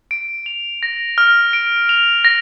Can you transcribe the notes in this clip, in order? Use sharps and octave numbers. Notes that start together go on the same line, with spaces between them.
D7
F7
A#6
F6
D7
F7
A#6